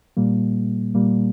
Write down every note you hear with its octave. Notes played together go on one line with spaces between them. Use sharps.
A#2 G3 A#3
A#2 G3 A#3